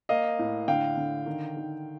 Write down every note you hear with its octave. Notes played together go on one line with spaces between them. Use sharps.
A#3 D#5 F5
A2
D3 F5 G5
D3
D#3
D#3